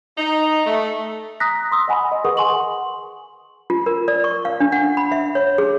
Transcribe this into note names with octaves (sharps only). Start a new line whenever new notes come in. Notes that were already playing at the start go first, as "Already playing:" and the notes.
D#4
A3
A#5 D#6 F#6 A#6 B6
C6 D#6 E6
D#5 F#5 G#5 B5
D#5
G#4 A#4 B4 F#5 C#6 D#6
F#5 G#5 C6 C#6 F#7
F4
A#4
D5
C#6
F5
D4
F#5
B5
E5
C#5
G#4